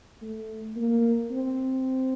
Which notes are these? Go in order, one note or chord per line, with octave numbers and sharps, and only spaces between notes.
A3
A#3
C4